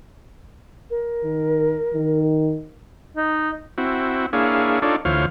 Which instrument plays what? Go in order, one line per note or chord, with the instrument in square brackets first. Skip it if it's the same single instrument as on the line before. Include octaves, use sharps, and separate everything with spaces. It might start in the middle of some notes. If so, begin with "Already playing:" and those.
[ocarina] A#4
[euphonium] D#3
D#3
[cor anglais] D#4
[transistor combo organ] C4 E4 F#4
A#3 D4 E4 G#4 C#5 F5
D4 D#4 F4 A4 C#5 D5
D2 E3 F4 C5 C#5 F6